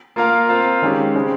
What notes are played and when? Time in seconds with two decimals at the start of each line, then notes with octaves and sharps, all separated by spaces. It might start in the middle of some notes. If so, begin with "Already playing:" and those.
0.16 A#3 F4 A#4 F5
0.49 C4 F4 A#4 F5
0.82 D#3 G#3 C#4 G4
1.15 C#3 G#3 C4